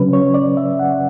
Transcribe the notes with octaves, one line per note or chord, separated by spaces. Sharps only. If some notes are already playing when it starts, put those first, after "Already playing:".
Already playing: C#3 F#3 C#4 B4
C#5
D5
E5
F#5